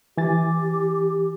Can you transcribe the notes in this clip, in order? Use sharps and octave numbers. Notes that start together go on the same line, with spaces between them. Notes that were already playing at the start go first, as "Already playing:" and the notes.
E3 G4 G#5 A6